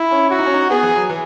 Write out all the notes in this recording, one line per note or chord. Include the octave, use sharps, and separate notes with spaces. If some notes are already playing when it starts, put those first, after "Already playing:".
Already playing: E4
C#4
E4 F#4
D#4
C#4
D#4
B3 G#4
E3
F#3
E3